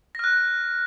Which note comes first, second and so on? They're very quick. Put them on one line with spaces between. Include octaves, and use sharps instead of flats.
A#6 F6 F#6